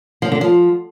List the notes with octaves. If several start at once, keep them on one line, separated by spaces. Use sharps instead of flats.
F3
D3
F3